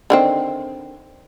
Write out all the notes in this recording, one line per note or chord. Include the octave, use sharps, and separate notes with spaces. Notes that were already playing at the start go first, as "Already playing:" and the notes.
D3 D#3 C4